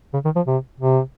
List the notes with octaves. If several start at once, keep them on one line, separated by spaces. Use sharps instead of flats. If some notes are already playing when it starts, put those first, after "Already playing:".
C#3
D#3
F3
C3
C3